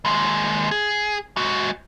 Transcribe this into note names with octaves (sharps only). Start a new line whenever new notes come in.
D#2 G#3
G#4
G#3 F#4